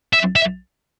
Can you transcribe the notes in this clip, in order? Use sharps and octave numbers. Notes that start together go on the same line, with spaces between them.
E5
E5